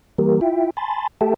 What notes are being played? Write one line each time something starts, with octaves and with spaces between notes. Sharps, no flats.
E3 G3 A#3 G4 A#4
E4 F4 E5 G5
G#5 A5 B5 C6 A6
A3 G4 A4 E5 G5 A5